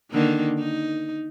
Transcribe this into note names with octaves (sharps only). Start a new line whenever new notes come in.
D3 D#3 A#3
D#4